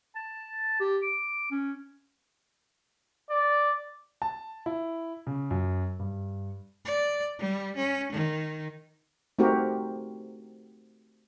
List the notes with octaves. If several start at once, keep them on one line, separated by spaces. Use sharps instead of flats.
A5
G4
D6
C#4
D5
A5
E4
C#3
F#2
G2
D5
G3
C#4
D#3
A3 C4 D#4 F#4 G4 A#4